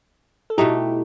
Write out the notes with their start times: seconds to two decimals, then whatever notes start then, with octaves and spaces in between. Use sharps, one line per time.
0.50 A4
0.58 B2 A3 D#4 E4 G4